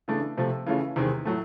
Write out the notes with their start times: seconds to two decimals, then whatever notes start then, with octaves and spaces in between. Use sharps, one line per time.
0.08 C#3 E3 A3 D4
0.38 C3 F3 A3
0.66 C#3 E3 A3 C#4 F4
0.96 E2 C3 D#3 G#3 C4
1.25 A2 F#3 A3